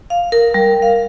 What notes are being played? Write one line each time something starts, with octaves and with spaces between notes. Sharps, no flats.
F5
A#4
G3
F5